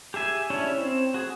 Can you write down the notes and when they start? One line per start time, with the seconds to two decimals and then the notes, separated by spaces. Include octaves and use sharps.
0.14 G4 G#4 E5 G#5
0.50 C#4 D4 E4 G4 C#5
0.78 C4
1.14 F#4 G#4